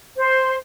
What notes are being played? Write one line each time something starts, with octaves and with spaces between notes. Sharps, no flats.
C5